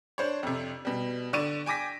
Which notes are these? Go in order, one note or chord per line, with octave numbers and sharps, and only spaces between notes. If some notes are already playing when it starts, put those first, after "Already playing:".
D4 C5 C#5
F2 C3
B2 G3
D3 D5 C#6 D#7 E7
G5 G#5 D6 A#6 B6